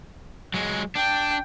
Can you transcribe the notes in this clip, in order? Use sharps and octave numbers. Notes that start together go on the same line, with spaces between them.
F#3 G#3
D4 G5